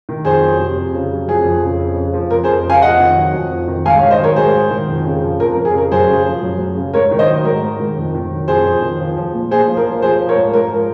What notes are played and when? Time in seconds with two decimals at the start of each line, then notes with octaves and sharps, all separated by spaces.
0.09 D#3
0.25 F2 G#4 C5
0.42 F#3
0.59 C3
0.76 F2
0.94 C#3
1.12 F#3
1.28 F2 G#4
1.45 F2
1.63 C#3
1.79 F2
1.96 C#3
2.14 F3
2.31 F2 A#4
2.44 G#4 C5
2.48 F2
2.65 C#3 F5 G#5
2.82 F2 D#5 F#5
2.99 D#3
3.16 F#3
3.34 F2
3.51 F2
3.68 D#3
3.86 G#2 F5 G#5
3.98 C#5 F5
4.03 D#3
4.11 C5 D#5
4.19 F#3 A#4 C#5
4.36 G#2 G#4 C5
4.54 G#2
4.71 D#3
4.88 F2
5.05 C#3
5.22 F3
5.40 F2 A#4
5.52 A#4
5.57 F2
5.65 G#4
5.74 C#3 A#4
5.91 F#2 G#4 C5
6.08 C#3
6.26 F3
6.42 F#2
6.59 F#2
6.77 C#3
6.94 G#2 A#4 C#5
7.11 D#3
7.19 C5 D#5
7.28 F#3
7.45 G#2 A#4
7.62 G#2
7.79 D#3
7.97 F2
8.14 D#3
8.31 F#3
8.48 F2 G#4 C5
8.65 F2
8.82 D#3
8.99 F3
9.16 F3
9.34 A#2
9.51 A#2 G#4 C5
9.68 F3
9.77 A#4
9.86 F3
10.02 F3 G#4 C5
10.19 F3
10.29 A#4 C#5
10.36 G#2
10.54 G#2 A#4
10.71 F3